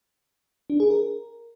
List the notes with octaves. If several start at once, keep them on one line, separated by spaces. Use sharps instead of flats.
D4
G#4
A#4